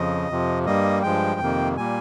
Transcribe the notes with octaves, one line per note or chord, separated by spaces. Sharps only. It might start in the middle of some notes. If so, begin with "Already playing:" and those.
Already playing: F2 C#3 F3 D#5
F2 C3 F3
G2 G3 A#3 D#5
G2 F3 G#3 G5
F2 C3 D#3 A#3
A#2 G3 A#3 G#5